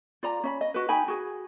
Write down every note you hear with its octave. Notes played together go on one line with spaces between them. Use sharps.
F4 D5 A#5
C#4 D#5 B5
D#5
F#4 B4
D#4 G5 G#5 B5
F#4 G#4